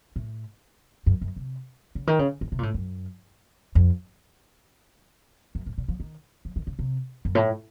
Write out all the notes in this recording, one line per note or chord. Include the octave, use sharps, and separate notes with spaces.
A2
F#2
F#2
C3
C#3
D#3
C#3
D#3
C3
A#2
A2
F#2
F2
F#2
A2
A#2
F3
D#3
F3
D#3
C#3
C3
F#2
A2